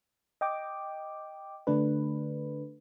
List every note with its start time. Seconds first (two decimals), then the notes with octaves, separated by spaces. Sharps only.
0.41 D#5 G5 D6
1.67 D3 A3 D4 B4